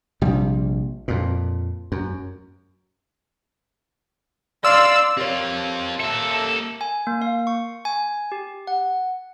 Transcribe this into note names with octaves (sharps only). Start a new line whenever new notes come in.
A#1 C3 G3
F2 A#2
F#2
D5 F5 C6 E6
C4 F4 G4 A#4 C#5
A#3 A4 E5
G#5
A#3
F5
C#6
G#5
G4
F#5